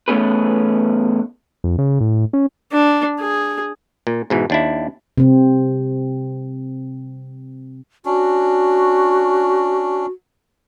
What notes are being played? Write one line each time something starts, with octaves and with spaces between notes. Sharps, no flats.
E2 A3 B3 C#4 G#4 B4
F2
C#3
A2
C#4
D4
G#4
A#2
G#2 B2 E3
D#2 D4 E4
C3 C4
C#4 D4 F#4